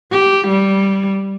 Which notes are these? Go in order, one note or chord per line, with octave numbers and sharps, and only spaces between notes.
G4
G3